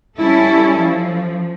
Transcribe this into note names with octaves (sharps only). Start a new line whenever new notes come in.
G3 C#4 E4 A4
F3